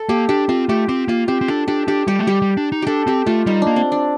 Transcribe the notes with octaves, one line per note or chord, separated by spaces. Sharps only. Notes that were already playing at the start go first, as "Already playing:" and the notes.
Already playing: A4
A#3 G4
D4 G4
C4 F4
A3 G4
C4 G4
A#3 F4
C4 G4
C4
D4 A4
D4 G4
D4 G4
G3 G4
A3
G3 G4
G3
D4
D#4
D4 G4 A4
C4 G4
A3 F4
G3 D#4
A#3 D4
C4
D4